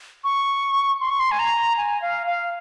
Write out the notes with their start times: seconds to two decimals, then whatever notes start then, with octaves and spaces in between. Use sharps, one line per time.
0.24 C#6
1.01 C6
1.10 C#6
1.20 C6
1.31 G#5
1.39 A#5
1.77 G#5
2.02 F5
2.27 F5